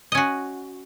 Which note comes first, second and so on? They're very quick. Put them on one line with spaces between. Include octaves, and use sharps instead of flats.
D#5 C#4 F#4